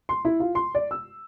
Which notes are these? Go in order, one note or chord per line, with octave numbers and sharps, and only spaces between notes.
C6
E4
F4
C6
D5
E6